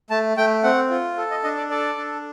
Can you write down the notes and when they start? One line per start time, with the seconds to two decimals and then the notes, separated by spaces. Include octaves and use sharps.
0.10 A3 A5
0.37 A3 G5
0.63 C4 F#5
0.90 F4
1.17 A4
1.31 D#5
1.44 D4 D#5
1.57 D5
1.70 A4 D5
1.98 D4